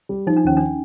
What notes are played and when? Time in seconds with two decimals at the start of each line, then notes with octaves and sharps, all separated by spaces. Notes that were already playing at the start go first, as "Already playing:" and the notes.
0.09 G3
0.27 F3 D#4
0.37 D4
0.44 D#2 C#4
0.57 D4